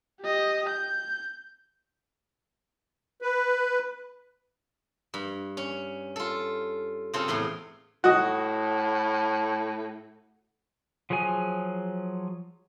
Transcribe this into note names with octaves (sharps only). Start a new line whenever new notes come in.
G4 D#5
G6
B4
G2
C#4
F4 A4
C#3 C4 F4 A4
E2 A2 G#4 C6
A2 F#4 D#5
F3 F#3 G#4 C#5 G#5